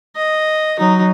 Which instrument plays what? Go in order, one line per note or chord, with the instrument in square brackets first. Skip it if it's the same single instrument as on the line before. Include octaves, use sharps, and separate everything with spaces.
[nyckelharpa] D#5
[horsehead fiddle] F#3 [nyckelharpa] D#4